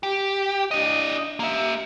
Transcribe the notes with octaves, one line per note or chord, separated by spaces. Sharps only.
G4
D4 D#5
A#3 E5